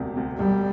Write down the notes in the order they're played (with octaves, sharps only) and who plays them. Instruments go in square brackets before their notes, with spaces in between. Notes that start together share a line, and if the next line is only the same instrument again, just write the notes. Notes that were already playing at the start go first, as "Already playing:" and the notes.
Already playing: [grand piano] E1 D2 C3
D2 C3
[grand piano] E1 [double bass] G3